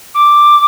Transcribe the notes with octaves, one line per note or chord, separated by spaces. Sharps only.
D6